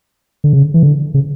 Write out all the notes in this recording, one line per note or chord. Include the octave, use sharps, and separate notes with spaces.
D3
C#3
E3
D3
C#3